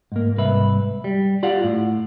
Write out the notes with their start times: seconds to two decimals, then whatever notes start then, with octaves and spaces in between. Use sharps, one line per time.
0.12 G#2 A#3
0.37 C2 G#2 B4 E5
1.04 G3
1.43 F4 G4 D5 F5 F#5
1.64 A2